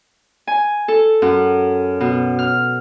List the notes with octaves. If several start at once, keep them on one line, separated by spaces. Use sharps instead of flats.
G#5
A4
F#2
B2
F6